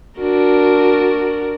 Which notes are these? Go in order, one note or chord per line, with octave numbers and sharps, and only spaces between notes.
D4 F#4 A#4